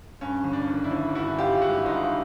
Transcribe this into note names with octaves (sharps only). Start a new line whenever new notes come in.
G2 C#4
G1
D4
D#3
D4 E4
G1
G2 E4 F#4
G1 F4 G4
G#3 E4 F#4
G2 D#4 F4